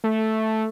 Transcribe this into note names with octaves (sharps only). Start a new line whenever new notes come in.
A3